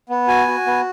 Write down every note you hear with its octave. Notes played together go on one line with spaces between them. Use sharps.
B3
F#4 G#5
F#4
B3